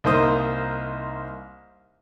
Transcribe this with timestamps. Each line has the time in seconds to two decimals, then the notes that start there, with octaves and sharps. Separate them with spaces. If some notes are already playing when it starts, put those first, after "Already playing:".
0.04 C2 A#3 D#4 C5 D#6